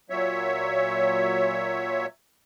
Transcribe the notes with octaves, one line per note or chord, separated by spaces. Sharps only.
A#2 F#3 C#5 E5